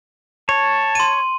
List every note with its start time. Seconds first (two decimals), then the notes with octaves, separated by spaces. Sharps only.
0.49 C#5 A5
0.95 C6 D#7